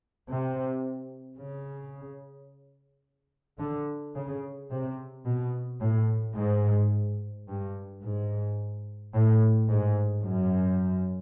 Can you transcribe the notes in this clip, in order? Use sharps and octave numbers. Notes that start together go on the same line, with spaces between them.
C3
C#3
D3
C#3
C3
B2
A2
G#2
G2
G#2
A2
G#2
F#2